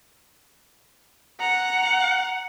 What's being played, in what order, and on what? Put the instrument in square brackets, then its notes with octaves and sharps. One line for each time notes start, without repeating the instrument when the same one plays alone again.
[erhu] F#5 [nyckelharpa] A#5